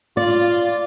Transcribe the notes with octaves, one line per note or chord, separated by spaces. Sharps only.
F4 D5